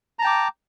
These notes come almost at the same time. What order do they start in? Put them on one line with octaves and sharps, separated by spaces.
A#5 A5 G5 D6